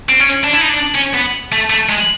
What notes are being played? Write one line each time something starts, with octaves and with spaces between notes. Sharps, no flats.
C4
C#4
D4
E4
D#4
D4
C#4
B3
A3
A3
G#3